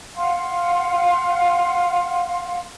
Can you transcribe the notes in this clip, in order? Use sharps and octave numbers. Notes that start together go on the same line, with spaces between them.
F5 F#5 C6